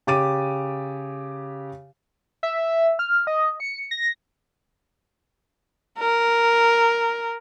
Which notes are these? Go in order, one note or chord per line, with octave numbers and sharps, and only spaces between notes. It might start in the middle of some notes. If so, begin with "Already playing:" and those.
C#3 G4 D6 A6 D#7
E5
F6
D#5
C#7
A#6
A#4